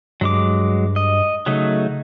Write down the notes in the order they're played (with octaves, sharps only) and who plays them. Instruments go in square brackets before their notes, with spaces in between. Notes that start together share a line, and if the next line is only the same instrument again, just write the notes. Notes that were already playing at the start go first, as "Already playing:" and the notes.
[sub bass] G2 [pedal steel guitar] F#3 G#3 D6
[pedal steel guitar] D#5
[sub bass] C#3 [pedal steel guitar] F#3 A3 D#4